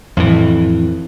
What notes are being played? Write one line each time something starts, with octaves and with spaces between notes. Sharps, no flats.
F2 A2 E3